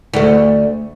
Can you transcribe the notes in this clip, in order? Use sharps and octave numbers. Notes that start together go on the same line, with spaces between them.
D2 A3